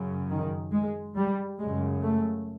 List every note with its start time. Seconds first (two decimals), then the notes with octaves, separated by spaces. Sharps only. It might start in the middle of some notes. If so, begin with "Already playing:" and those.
Already playing: F#2 C#3
0.29 D#3
0.72 G#3
1.15 G3
1.59 F#2 C#3 G#3
2.02 A3